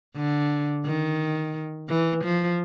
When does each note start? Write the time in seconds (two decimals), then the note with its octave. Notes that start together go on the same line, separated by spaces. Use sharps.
0.16 D3
0.85 D#3
1.89 E3
2.24 F3